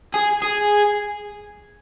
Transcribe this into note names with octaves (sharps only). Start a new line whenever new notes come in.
G#4
G#4